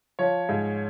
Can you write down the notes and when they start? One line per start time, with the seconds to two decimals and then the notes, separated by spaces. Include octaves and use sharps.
0.19 F3 C#5
0.49 G#2